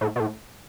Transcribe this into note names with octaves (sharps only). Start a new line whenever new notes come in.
A2
B2
A2